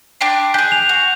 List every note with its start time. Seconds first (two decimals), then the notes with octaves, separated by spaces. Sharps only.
0.21 D4 G4 C6
0.54 G4 G#4 G#5 F#6 G6
0.72 F7
0.89 F#4